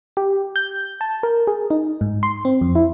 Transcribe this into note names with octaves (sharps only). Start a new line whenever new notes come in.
G4
G6
A5
A#4
G#4
D#4
G#2
C6
C4
F2
E4